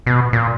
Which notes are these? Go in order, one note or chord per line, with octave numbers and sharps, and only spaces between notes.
B2
A#2